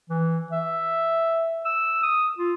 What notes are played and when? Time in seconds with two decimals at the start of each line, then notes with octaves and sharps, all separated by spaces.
0.10 E3
0.52 E5
1.65 E6
2.03 D#6
2.39 F4